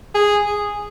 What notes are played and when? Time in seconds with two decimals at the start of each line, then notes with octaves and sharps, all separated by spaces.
0.15 G#4
0.45 G#4